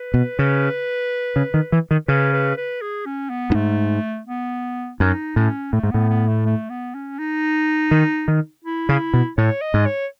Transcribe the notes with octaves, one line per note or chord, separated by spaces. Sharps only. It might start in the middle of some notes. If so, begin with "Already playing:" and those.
Already playing: B4
B2
C#3
C#3
D#3
E3
D#3
C#3 B4
B4
B4
G#4
C#4
B3
F#2
G#2 A3
B3
F#2 D#4
A2 C#4
A2 A3
G#2
A2 B3
B3
A3
A3
B3
C#4
D#4
D#3
D#3
E4
C#3
B2
A2 C#5
D#5
G#2
C#5